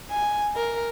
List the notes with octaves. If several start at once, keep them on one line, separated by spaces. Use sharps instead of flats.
G#5
A#4